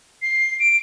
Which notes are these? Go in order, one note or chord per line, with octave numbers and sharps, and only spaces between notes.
C7
D7